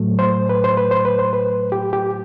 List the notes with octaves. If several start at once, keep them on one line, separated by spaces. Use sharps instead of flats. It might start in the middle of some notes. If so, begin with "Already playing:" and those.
Already playing: A2 F#3 A3
C5
B4
C5
B4
C5
B4
C5
B4
G4
G4